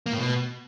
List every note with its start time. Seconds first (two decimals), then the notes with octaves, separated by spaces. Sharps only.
0.06 A#3
0.12 A2
0.18 B2